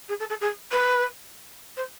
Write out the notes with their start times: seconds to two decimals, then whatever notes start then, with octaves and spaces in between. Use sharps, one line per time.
0.08 G#4
0.19 A4
0.29 A4
0.40 G#4
0.72 B4
1.76 C5